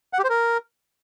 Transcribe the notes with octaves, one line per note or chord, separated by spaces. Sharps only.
F#5
G4
C5
A#4